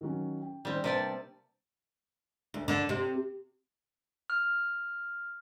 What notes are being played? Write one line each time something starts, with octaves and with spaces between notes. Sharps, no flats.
D#3 F#3 C#4
G5
D#3 G3 C4 C#4
C3 A#3 D4 B4 D5 A5
D2
D3
C3
F6